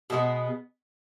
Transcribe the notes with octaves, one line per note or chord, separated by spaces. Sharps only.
B2 G#3 B3